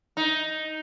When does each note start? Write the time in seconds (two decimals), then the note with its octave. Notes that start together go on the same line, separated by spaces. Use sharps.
0.17 D#4